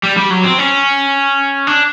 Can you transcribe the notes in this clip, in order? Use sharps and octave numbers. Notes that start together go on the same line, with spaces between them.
G3
G3
F#3
C4
C#4
D4